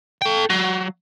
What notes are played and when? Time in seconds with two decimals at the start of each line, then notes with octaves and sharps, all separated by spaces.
0.22 A4 G5
0.50 F#3